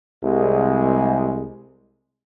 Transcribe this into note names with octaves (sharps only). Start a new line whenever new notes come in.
C2 G#3